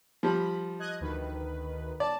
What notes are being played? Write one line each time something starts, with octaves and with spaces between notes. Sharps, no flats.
F3 G3 B5
D#5 F#6 G#6
D2 D#3 B4
D5 A5